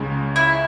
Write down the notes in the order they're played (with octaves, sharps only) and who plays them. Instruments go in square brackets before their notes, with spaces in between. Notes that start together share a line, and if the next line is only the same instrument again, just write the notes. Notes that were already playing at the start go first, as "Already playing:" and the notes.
Already playing: [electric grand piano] C#2 C#3 G#3
[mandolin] E4